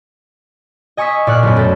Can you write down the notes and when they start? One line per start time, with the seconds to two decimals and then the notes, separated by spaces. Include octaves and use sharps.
0.97 D#5 G#5 C#6 D#6 E6 B6
1.27 A#2 D5 C#6 F6 F#6
1.43 B1 F#2
1.57 A3 A4